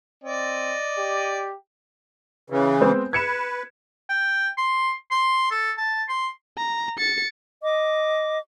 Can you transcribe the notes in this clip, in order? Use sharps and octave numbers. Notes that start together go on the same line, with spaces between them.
C4 D5 D#5
G4
C#3 E3
G#3 B3 C4
B4 G#6 C#7 E7
G5
C6
C6
A4
A5
C6
A#5
A6 C#7
D#5 D6